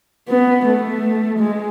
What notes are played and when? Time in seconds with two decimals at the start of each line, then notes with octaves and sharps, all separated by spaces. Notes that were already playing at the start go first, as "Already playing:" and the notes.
0.29 B3
0.66 A3
1.39 G#3